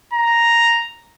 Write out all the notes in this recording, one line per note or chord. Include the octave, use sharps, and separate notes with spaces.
A#5